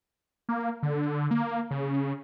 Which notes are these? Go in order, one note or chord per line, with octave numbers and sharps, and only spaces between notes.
A#3
D3
A#3
C#3